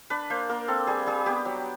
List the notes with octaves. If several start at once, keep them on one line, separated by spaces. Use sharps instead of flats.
D4 B4
A#3 C5
A#3 A#4
C4 A4
G3 G#4
G3 G#4
B3 G4
F#3